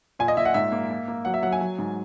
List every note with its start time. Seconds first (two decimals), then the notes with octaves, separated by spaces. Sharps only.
0.19 A#2 G#5
0.28 D#5
0.37 A#2 E5
0.45 F#5
0.54 G#2 E5
0.72 A#3
0.90 A#3
1.08 A#3
1.25 F#3 F#5
1.34 E5
1.42 F#3 F#5
1.52 G#5
1.61 F#3
1.79 G#2